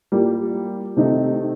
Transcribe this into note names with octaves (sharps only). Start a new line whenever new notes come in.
A2 G3 A#3 F4
C3 D#3 A3 D#4